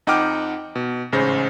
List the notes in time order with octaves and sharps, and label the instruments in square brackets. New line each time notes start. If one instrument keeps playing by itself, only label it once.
[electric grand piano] F2 D#4 F#5 G5 D6 F6
B2
A1 G#2 C#3 C5 A#6